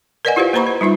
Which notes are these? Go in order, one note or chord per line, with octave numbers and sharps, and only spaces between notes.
A#4 B4 D5 D#5 F#5 G#5
E4 F4 G4 B4 C5 F5
A#3 B4 C5 A#5 B5 C#6
B4
G3 D#4 F4 E5